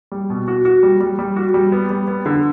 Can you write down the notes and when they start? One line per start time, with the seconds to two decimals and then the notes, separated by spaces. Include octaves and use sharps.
0.12 G3
0.30 B2
0.48 F#4
0.65 F#4
0.83 G3
1.01 G3
1.19 G3
1.36 F#4
1.54 G3
1.72 B3
1.90 G3
2.08 B3
2.26 D3